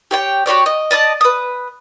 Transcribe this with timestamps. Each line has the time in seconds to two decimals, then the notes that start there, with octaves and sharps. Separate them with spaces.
0.11 G4 C#5 G5
0.46 F#4 G4 C#5 D5
0.66 D#5
0.91 D5 D#5 A5 D#6
1.21 B4 D#6